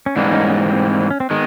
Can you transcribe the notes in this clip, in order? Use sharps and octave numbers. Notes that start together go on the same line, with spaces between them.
C#4
G#2 E3 G3 A#3 C4 D4
C#4 D#4
B3 C#4
C4
C#4
C4
D#3 G#3 B3